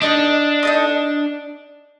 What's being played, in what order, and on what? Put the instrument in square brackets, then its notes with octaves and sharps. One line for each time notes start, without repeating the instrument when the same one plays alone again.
[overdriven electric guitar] D4 [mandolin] D#4 A4 D#5
[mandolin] D#4 A4 D#5